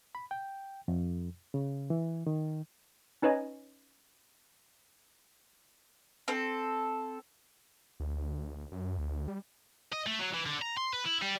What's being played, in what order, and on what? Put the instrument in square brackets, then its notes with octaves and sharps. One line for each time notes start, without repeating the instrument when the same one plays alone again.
[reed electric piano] B5
G5
F2
C#3
E3
D#3
[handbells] C#4 D#4 B4 C#5 D#5 G#5
[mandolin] C4 A4
[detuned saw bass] D2
F#2
D2
G3
[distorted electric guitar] D#5
A3
F#3
E3
D3
A#5
C6
B4
E4
G3